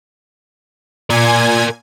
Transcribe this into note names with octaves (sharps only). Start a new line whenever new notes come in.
A#2 A#4 D5 G#5 G#6